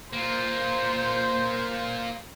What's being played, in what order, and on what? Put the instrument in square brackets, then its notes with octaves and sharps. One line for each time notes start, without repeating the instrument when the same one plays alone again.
[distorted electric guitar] A#3 F4 [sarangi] C5